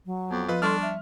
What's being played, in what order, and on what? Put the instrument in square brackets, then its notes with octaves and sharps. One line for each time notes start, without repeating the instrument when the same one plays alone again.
[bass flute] F#3
[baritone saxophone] F2 [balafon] B3
[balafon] F3 [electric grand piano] F4 B4
[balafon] G3 C6 [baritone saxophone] D4 [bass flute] A4 [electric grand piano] C#6 F6
[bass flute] E5